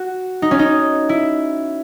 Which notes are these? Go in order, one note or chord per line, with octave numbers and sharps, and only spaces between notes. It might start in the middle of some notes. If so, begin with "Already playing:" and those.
Already playing: F#4
D#4
C#4
D#4
E4